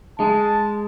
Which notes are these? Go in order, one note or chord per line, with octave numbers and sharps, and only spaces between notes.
G#3 A5